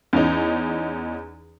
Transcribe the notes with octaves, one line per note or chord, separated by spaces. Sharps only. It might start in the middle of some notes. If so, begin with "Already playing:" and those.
E2 C#4 D#4